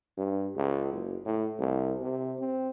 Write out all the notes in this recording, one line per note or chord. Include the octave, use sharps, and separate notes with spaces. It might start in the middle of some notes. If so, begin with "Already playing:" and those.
G2
C#2
F#1
A2
C2
C3
C4